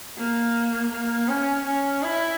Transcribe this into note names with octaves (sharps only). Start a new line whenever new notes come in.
A#3
A#3
C#4
C#4
E4